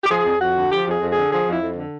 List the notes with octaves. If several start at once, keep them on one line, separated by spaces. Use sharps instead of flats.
G4
F3 G#4
F2
F2 F#4
D3
F3 G4
F2
G#4
F2
D3 G#4
F3 G#4
F2
E4
F2
D3